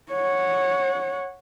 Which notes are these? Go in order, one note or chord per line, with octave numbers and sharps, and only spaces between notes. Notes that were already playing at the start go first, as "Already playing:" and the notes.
C#5 F#5